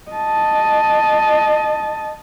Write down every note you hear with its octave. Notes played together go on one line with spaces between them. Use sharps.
D#5 A5